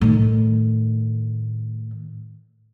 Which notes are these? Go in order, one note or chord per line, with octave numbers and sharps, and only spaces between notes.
A2 D#3